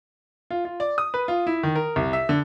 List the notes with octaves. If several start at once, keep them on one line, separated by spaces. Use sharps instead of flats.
F4
F4
D5
D#6
B4
F4
E4
D#3
A#4
C2
E5
D3